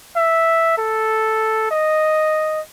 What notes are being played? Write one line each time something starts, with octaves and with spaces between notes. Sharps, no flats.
E5
A4
D#5